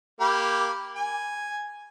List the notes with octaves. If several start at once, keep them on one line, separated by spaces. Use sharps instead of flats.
A#3 G4 B5
G#5